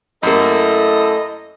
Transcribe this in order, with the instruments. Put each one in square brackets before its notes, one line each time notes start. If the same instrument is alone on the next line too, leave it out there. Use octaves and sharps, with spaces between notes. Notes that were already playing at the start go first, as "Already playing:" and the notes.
[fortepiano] F#2 A#3 [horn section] A3 E4 A4 [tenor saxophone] D#5